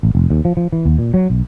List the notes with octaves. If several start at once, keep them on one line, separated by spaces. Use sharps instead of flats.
A1
F1
D#2
F3
F3
E3
D#2
A#2
F#3
B1